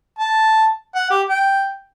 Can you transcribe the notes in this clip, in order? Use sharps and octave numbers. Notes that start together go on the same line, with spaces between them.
A5
F#5
G4
G5